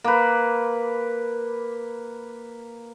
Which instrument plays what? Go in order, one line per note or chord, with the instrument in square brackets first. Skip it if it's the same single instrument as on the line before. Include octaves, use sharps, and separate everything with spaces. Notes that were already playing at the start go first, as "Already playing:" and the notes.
[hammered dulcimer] A#3 B4